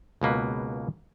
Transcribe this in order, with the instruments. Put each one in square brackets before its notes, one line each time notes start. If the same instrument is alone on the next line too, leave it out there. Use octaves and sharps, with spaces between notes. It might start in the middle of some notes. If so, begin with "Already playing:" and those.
[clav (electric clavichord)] C#2 B2 A#3 B4